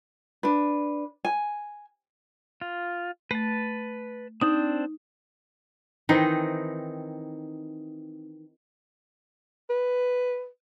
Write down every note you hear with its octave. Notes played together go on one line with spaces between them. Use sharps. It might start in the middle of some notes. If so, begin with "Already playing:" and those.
D4 B4
G#5
F4
A3 B4 A5
C4 D4 D#4 C5
D#3 E3 C4 D#4
B4